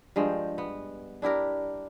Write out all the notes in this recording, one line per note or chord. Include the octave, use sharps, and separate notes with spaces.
G2 F3 G#3 G5
B3
D4 E4 G4 A#4